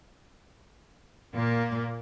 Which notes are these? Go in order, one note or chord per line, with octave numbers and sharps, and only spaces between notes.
A#2 A#3